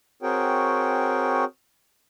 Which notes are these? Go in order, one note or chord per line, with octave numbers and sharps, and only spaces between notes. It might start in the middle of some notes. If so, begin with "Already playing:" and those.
C4 F#4 G#4 A#4 C#5 G5